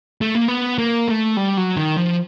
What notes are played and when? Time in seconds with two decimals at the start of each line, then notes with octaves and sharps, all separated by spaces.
0.21 A3
0.35 A#3
0.48 B3
0.78 A#3
1.08 A3
1.37 G3
1.57 F#3
1.77 D#3
1.96 F3